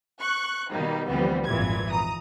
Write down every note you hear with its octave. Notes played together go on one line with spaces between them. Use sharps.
C#6 F#6
B2 D#3 G3 A#3 D#4
D2 E3 F3 G3 B3 C4
G#1 F2 A#2 E3 G#6
A#5 D#6